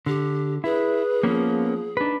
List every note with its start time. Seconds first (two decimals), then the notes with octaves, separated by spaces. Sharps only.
0.06 D3 G4
0.64 E4 G#4 B4
1.23 F3 A#3 B3 C#4
1.97 D4 D#4 B4